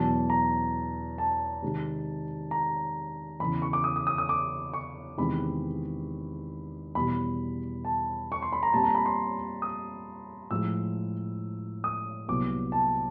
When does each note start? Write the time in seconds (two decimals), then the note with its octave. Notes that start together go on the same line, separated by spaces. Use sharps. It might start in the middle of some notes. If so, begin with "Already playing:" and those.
Already playing: E2 B2 F#3 A5
0.30 A#5
1.18 A5
1.62 C3 D#3 G#3
2.51 A#5
3.40 E2 C#3 E3 B5
3.62 C#6
3.73 D6
3.84 D#6
3.96 D#6
4.07 D#6
4.18 D#6
4.29 D6
4.73 C#6
5.18 E2 C3 D#3 G#3 C4 B5
6.95 E2 B2 G3 B5
7.85 A5
8.32 C#6
8.42 C6
8.52 B5
8.63 A#5
8.73 A#2 G3 C4 A5
8.84 A#5
8.95 B5
9.06 C6
9.62 D#6
10.51 A2 F3 G#3 E6
11.84 D#6
12.28 C2 A#2 F#3 B3 D6
12.72 A5